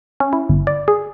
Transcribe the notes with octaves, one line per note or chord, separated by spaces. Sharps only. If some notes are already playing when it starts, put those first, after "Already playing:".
C#4
E4
G1
D5
G#4